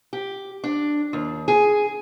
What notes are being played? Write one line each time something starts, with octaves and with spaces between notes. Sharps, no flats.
G4
D4
D#2
G#4